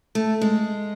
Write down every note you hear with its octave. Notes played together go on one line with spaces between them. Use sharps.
A3
G#3